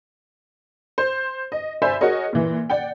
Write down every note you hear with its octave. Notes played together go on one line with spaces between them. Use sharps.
C5
D#5
C5 D5 E5 G#5 B5
F#4 G#4 A#4 C#5 D#5
A#2 E3
D5 F#5 G5